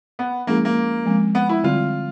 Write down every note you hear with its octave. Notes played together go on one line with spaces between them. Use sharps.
B3
F3 G#3 A#3 C#4 E4 G#4
A#3
F3 G#3 C4
B3
E4
D3 G3 C4 F4